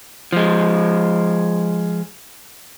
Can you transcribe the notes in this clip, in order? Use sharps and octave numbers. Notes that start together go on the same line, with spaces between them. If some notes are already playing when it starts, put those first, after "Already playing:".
F3 G#3